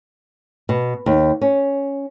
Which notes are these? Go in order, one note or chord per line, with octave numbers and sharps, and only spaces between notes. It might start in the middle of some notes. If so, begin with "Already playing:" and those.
B2
D#2
C#4